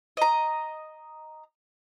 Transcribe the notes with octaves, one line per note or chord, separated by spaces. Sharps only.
D#5 A#5